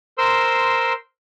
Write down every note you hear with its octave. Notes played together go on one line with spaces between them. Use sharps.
A#4 C5 C6 E6